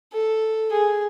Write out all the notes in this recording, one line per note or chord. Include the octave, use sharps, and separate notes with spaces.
A4
G#4